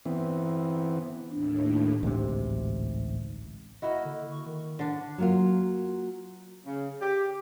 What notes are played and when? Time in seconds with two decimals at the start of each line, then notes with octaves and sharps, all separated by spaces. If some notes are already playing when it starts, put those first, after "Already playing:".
0.05 E3 B3 C4
1.31 D#2 A2 D4
2.03 A1 D2 G#2 C3
3.82 A#3 E4 F#4 D#5
4.05 D3
4.32 C#6
4.46 D#3
4.79 D3 D4
5.18 F#3 A#3 F4
6.65 C#3
7.01 G4